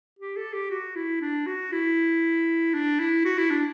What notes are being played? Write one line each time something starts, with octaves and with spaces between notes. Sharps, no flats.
G4
A4
G4
F#4
E4
D4
F#4
E4
D4
E4
F#4
E4
D4